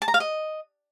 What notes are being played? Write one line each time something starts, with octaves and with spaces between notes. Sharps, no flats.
A5
A#5
F5
D#5